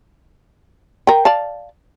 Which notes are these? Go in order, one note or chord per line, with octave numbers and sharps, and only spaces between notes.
A#4 G5
D5 F5 A5